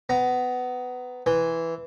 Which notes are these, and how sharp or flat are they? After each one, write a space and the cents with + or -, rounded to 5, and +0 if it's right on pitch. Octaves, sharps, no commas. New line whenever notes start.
B3 +20 A#5 +0
E3 +0 C6 +0